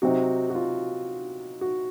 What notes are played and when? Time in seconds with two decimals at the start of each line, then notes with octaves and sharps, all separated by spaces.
0.02 C3 F#3 C4 D#4 F#4
0.50 F#4
0.55 F4
1.61 F#4